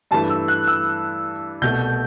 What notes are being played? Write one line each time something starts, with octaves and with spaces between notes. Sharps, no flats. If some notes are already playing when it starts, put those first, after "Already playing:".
G2 E3 A3 A5
E6
F#6
E6
C2 B2 A3 G6